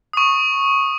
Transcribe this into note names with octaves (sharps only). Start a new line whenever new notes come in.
C#6 D#6